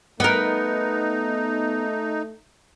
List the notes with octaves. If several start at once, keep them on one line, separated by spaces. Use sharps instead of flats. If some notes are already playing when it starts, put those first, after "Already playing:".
A3 B3 D#4 A#4